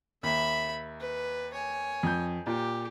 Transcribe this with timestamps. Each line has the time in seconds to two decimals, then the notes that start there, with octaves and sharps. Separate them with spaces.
0.23 D#2 E5 B5
1.00 B4
1.54 C#5 G#5
2.03 F2 G6
2.47 A#2 G4